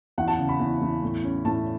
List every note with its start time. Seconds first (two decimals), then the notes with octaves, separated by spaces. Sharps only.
0.18 E2 F#5
0.28 A5
0.38 C#3
0.49 B5
0.60 E2
0.81 E2
1.03 A2
1.24 C#4
1.45 A2 A5